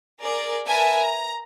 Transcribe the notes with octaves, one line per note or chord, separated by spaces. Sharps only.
G#4 A#4 D5
A#4 B4 E5 G#5 A5
A#5